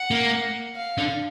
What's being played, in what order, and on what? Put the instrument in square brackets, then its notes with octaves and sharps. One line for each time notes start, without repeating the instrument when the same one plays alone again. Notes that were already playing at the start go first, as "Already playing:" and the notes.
Already playing: [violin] F#5
[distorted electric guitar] A#3
[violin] F5
[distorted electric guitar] D3